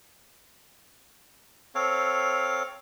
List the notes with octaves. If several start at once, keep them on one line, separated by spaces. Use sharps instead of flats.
C4 A4 C#5 F5